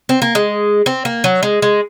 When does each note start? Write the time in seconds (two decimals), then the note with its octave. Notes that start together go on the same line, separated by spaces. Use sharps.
0.09 C4
0.22 A#3
0.35 G#3
0.86 C4
1.05 A#3
1.24 F#3
1.43 G#3
1.62 G#3